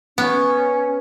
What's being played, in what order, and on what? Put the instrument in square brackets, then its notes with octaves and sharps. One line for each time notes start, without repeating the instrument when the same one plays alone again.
[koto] B3 [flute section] C#4